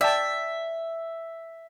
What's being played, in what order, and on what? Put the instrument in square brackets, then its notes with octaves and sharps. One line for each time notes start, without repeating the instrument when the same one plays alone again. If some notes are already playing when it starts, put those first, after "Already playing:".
[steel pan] D5 G5 A5 [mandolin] E5